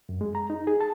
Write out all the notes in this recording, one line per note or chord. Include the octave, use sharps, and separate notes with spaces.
F#2
G#3
A#5
D#4
G#4
A5